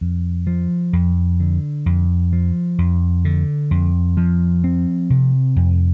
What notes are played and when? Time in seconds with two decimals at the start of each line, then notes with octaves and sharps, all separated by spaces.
0.01 F2
0.47 F3
0.93 F2
1.40 D3
1.86 F2
2.33 F3
2.78 F2
3.25 D3
3.71 F2
4.17 F3
4.64 C4
5.10 C3
5.56 F2